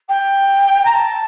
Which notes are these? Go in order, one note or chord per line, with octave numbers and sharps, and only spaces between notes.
G5
A#5
A5